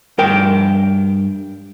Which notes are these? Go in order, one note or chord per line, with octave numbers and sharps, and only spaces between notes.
G2 A#4 G5